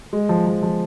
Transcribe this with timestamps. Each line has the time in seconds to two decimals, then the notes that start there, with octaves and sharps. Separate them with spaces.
0.13 G#3
0.29 F3
0.47 F3
0.63 F3